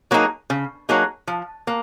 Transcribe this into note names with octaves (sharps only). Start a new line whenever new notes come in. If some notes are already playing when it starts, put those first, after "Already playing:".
F#3 A#3 D#4 G#4
C#3
F#3 A#3 D#4 G#4
F3
A#3